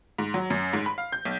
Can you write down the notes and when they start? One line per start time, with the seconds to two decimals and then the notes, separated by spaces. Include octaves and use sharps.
0.19 G#2
0.34 F#3
0.50 F#2
0.73 G#2
0.86 B5
0.98 F5
1.12 G6
1.25 B1